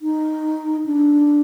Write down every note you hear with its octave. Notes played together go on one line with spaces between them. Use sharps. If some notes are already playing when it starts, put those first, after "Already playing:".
D#4
D4